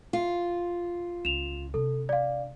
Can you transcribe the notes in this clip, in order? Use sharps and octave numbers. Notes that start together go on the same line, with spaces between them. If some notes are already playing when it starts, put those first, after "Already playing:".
F4
C#2 E7 F7
C3 D4 A4
D5 F5